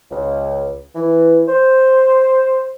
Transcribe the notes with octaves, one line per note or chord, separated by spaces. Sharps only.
C#2
E3
C5